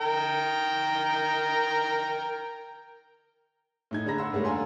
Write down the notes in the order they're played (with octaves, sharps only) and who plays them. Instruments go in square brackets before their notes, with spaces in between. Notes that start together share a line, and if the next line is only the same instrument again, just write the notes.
[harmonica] A#4 G5 A#5
[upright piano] A2 D#4 G#6
D3 D4 G#4 A#5 B5 A#6
F#5 C6 E6
G#2 C#3 G3 A3 A#3 C#4
D#2 D4 A4 G#5 A#5 C6